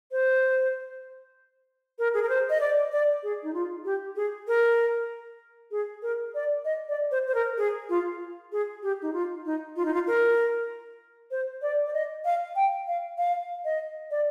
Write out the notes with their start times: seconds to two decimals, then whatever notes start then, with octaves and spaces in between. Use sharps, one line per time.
0.12 C5
1.99 A#4
2.14 G#4
2.23 A#4
2.29 C5
2.50 D#5
2.61 D5
2.92 D5
3.23 G#4
3.43 D#4
3.54 F4
3.85 G4
4.16 G#4
4.48 A#4
5.71 G#4
6.02 A#4
6.34 D5
6.65 D#5
6.89 D5
7.11 C5
7.27 C5
7.35 A#4
7.58 G#4
7.89 F4
8.52 G#4
8.83 G4
9.02 D#4
9.13 F4
9.45 D#4
9.76 F4
9.85 D#4
9.94 F4
10.07 A#4
11.31 C5
11.62 D5
11.86 D5
11.94 D#5
12.25 F5
12.56 G5
12.88 F5
13.18 F5
13.65 D#5
14.11 D5